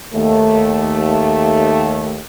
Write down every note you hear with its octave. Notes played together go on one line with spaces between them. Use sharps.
D#2 A3